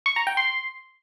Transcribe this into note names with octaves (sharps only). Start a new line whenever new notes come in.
C#6
A#5
G5
C6